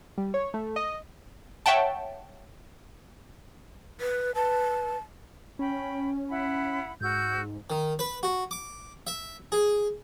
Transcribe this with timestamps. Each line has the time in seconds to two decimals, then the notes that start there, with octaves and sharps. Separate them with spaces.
0.18 G3
0.34 C#5
0.54 A3
0.76 D#5
1.66 C#5 E5 F#5 G5 A5
4.01 B4
4.35 B4 A5
5.59 C#4 G5 B5
6.29 E4 F#5 B5
7.01 G#2 F#4 E6 G6
7.70 D#3
7.99 B4
8.23 F#4
8.51 D6
9.07 E5
9.52 G#4